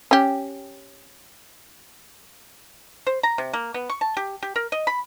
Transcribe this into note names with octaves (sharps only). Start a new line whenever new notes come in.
C#4 G4
C5
A#5
C3
A#3
B3
C#6
A5
G4
G4
A#4
D#5
B5